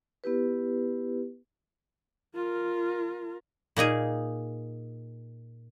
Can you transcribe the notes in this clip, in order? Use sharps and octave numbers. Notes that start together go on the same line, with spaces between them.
B3 E4 G4 B4
F4 A#4
A#2 A#3 D#4 G#4